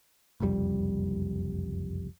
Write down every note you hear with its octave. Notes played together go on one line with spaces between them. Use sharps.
F#1 C2 F2 G3